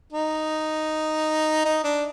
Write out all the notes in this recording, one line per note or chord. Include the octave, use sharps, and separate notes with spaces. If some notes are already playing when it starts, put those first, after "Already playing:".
D#4
D#4
D4